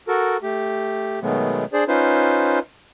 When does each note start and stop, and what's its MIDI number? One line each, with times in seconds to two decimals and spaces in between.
0.08 0.37 66
0.08 0.37 69
0.08 0.37 70
0.43 1.19 57
0.43 1.19 67
1.22 1.65 47
1.22 1.65 51
1.22 1.65 54
1.22 1.65 56
1.22 1.65 57
1.22 1.65 59
1.73 1.84 62
1.73 1.84 68
1.73 1.84 72
1.73 1.84 74
1.88 2.59 61
1.88 2.59 63
1.88 2.59 65
1.88 2.59 71
1.88 2.59 72